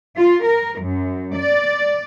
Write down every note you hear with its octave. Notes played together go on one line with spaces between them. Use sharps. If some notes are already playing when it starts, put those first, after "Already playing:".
F4
A#4
F#2
D5